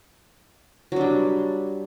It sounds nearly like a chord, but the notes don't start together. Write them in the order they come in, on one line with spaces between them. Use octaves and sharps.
F#3 D4 G3